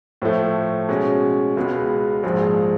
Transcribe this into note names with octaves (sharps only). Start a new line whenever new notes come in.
A2 F3 A3
B2 G#3 C#4
C#2 B2 G#3 B3
A#1 G#2 F3 G#3